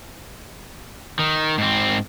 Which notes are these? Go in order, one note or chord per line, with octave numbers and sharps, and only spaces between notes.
D#3
G#2 C4